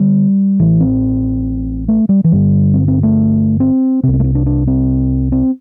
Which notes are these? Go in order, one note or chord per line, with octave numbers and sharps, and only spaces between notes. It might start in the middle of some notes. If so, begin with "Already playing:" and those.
Already playing: D3 G3
A1 A2 E3
C4
A3
G3
E3
G1 G2 D3 G3
C4
C4
A3
C4
C2 C3 C4
C4
A3
C4
D4
D4
C4
C4